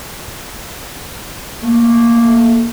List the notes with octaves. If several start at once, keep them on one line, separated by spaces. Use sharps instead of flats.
A3 A#3